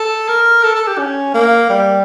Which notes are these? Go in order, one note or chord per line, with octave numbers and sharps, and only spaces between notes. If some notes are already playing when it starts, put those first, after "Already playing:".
Already playing: A4
A#4
A4
A4
G4
C#4
A#3
G3